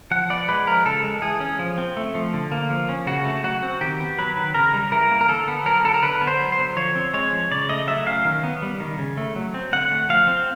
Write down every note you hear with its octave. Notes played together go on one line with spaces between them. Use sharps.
F3 F#5
B3 D5
G#3 B4
F3 A#4
C#3 A4
G#3
E3 G#4
C#4
F3
C4
A3
F3
D3
A#3
F3
C#4
C#3 F#4
A3
F#3 F#4
C4
D#3 G4
B3
F#3 B4
D#3
C#3 A#4
G3
E3 A#4
A#3
A#4
D3 A4
B3
F#3 A#4
D3 A4
A#4
D3 B4
B3
C5
F#3
C5
D3
F3 C#5
C4
G#3 C#5
F3
C#3 D5
A3 D#5
F#3 E5
C#4 F5
D#3
B3
G3
D#3
C#3
A3
F#3
C4
D3 F#5
A3
F3 F5
C4